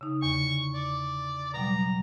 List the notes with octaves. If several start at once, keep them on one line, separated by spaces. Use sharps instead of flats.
C#3 D#4
E2 D3 C#6
D5
B2 F#3 G3 A#5